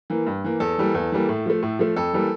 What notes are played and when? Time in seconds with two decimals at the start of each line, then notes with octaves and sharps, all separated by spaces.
0.10 E3 A#3
0.26 G2
0.44 E3 A#3
0.60 E2 A4
0.78 E3 G3 A#3
0.94 E2
1.12 E3 G3 A#3
1.29 A2
1.46 F3 A3
1.62 A2
1.79 F3 A3
1.96 F2 A4
2.13 E3 G3 A#3